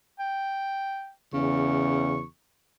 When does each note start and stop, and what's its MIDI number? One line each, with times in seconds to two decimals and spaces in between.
0.19 1.10 79
1.33 2.24 40
1.33 2.23 49
1.33 2.23 85